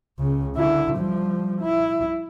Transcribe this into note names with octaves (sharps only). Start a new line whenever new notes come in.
C#2 C#3
D3 E4
F3 G3
E4